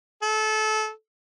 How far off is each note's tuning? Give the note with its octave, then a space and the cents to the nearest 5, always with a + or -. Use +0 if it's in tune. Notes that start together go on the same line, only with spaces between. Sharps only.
A4 -25